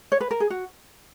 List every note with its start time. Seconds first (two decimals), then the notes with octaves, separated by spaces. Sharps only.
0.12 C#5
0.21 B4
0.31 A#4
0.40 G#4
0.50 F#4